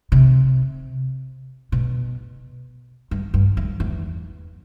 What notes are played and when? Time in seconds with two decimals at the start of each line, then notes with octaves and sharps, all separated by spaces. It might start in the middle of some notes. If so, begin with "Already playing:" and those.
0.12 C3
1.72 B2
3.11 G2
3.34 G2
3.57 F2
3.80 E2